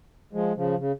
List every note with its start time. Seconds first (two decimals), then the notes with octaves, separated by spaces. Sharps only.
0.33 F3 G#3
0.56 C#3 F3
0.79 C#3